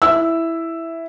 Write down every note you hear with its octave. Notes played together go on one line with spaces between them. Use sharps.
E4 E6